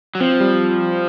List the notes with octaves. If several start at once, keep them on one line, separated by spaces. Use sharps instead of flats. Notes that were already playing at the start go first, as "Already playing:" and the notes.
F#3
F3 C4
G3